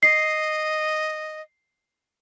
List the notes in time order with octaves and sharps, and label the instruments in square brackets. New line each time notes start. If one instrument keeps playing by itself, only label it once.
[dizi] D#5 [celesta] C7